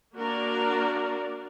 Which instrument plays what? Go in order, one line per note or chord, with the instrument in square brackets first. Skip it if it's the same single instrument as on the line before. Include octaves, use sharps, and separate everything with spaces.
[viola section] A#3 D4 F#4 A#4 D5